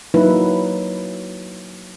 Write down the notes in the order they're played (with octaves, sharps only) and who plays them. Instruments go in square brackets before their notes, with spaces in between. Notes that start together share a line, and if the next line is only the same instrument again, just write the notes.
[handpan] F#3 A#3 D#4 E4 B4